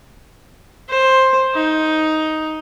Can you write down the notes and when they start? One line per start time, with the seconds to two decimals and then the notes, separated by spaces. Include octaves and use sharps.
0.89 C5
1.55 D#4